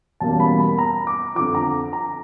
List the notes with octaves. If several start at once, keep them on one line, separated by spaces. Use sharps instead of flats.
E2 B2 G3 A#3 C#4 A5
B5
B5
A#5
D6
F2 D3 F3 D6
A#5
A#5